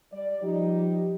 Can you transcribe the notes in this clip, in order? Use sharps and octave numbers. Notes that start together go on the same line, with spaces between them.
G3 D5
F3 G3 D#4 G4